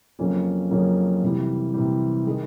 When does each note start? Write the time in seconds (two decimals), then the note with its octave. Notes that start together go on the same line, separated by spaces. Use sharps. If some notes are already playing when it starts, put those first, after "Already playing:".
0.19 F2 C#3 F#3 A#3 C#4
0.71 F2 C#3 F#3 A#3 C#4
1.22 C3 E3 G3
1.74 C3 E3 G3
2.26 D#3 G#3